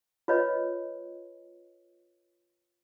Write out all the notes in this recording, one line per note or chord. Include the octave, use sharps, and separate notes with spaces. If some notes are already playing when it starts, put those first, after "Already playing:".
F4 B4 C#5 D#5